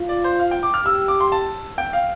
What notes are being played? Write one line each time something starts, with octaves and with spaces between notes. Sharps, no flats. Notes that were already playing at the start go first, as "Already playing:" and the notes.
Already playing: F4
D5
C5
F5
G5
D6
F6
G4 E6
D6
C6
A5
G5
F5